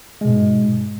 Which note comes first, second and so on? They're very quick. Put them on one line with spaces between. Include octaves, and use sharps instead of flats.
G#3 B2 G#2